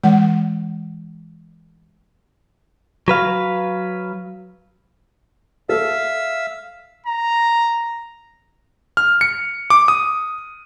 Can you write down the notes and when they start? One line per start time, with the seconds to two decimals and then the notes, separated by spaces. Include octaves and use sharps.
0.04 E3 G#3 F#5
3.08 F#3 B4 F5
5.69 A4 E5 F5 E6
7.06 A#5
8.97 F6
9.21 C#7
9.70 D6
9.88 D#6